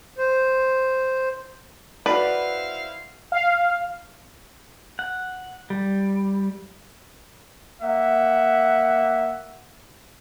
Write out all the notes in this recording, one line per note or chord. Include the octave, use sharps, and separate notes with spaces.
C5
E4 F#4 B4 C5 D5 F5
F5
F#5
G3
A#3 E5 F#5